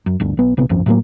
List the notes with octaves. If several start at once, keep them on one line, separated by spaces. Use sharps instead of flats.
F#2
G1 D2 D3
B1 B3
A#1 C3 B3
G#1 C#2 F#2 F3
A2 F#3 G3 A#3